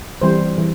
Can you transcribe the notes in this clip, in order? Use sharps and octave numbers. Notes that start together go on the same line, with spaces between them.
E3 G3 C4 C5
E3 G3